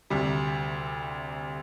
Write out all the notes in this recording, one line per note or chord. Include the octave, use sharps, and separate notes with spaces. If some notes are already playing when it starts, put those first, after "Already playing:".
D2 C3 G3